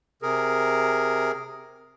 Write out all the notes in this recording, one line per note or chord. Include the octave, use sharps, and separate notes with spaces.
C3 G#4 A#4